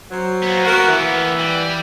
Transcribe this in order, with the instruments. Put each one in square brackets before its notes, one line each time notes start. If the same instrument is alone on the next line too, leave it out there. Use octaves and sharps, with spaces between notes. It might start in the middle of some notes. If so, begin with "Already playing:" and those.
[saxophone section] F#3 C5
[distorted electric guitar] A#3 B3
[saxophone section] F#4 A#4
E3
[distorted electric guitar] G3